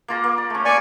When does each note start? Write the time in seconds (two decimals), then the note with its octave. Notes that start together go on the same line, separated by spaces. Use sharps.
0.08 A#3 F4 A#5
0.24 A#3
0.38 D5
0.50 A3 C#4
0.65 A#3 D5 G#5 C#6 D6